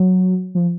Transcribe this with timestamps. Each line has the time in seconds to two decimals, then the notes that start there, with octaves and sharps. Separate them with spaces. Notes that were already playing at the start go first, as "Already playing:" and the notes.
Already playing: F#3
0.55 F3